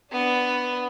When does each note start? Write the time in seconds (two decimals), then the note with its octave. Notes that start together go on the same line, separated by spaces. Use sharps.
0.11 B3 D4